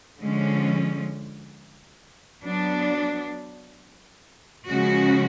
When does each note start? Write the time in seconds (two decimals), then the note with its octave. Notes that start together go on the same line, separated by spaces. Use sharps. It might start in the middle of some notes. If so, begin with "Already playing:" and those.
0.21 D3 F3 G#3 C#4
2.44 F#3 B3 D4
4.68 C#3 F3 G#3 C#4 F#4